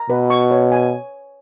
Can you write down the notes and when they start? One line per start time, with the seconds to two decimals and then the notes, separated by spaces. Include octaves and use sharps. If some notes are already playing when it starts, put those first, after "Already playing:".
Already playing: A#5
0.10 B2 B4
0.30 C#6
0.51 C#5
0.72 G#5